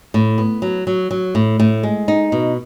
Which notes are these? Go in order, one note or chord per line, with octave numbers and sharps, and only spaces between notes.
A2
B3
F#3
F#3
F#3
A2
A2
G#3
D#4
B2